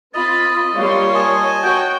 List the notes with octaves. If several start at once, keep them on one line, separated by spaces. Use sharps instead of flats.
C4 F4 D#5 B5 A6
G3 A#3 F4 C#5 F5 C6
D#5 G#5 A5 D#6
F#4 C#5 G5 G6